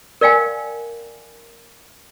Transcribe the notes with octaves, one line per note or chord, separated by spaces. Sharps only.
A#4 D5 F5 G5 G#5